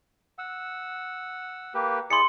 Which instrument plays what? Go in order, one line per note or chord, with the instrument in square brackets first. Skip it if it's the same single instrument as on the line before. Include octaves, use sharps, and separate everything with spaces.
[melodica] F#5 E6
A#3 G4 B4
[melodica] E4 G#4 D5 [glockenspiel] C6 C#7